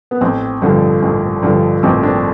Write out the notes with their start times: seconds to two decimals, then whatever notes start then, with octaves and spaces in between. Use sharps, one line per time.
0.11 B3
0.21 A1 C4
0.62 G2 D3 F3
1.02 A1
1.43 G2 D3 F3
1.83 A1 C4
2.03 D4